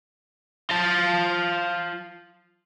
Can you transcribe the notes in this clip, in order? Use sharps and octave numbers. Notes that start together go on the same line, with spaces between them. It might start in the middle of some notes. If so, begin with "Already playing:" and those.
F4 A5